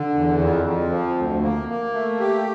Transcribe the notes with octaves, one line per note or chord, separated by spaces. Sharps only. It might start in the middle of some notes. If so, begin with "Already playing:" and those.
Already playing: D3
E2
F2
F2
F3
D2
A#3
A#3
A3
G4